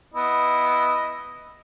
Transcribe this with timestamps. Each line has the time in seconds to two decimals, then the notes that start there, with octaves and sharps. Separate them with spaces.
0.14 B3 E4 D#5